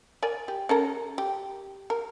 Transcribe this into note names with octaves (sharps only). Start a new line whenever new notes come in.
A#4 D5 G#5
G4
C#4 A4 A#4
G4
A#4